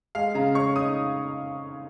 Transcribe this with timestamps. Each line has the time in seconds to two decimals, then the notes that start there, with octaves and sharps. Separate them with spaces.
0.15 G#3 F5
0.35 C#3 A#5
0.55 C#5 C#6
0.76 D#4 D#6